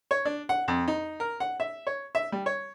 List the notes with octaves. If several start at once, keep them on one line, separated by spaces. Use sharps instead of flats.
C#5
D4
F#5
F2
D#4
A#4
F#5
E5
C#5
E5
G3
C#5